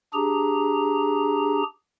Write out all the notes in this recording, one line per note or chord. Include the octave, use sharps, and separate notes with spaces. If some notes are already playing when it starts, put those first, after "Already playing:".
D4 G4 G#4 A#5